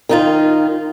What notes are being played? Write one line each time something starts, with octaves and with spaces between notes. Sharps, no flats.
D#3 D#4 F4